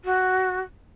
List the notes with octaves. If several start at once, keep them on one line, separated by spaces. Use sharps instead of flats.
F#4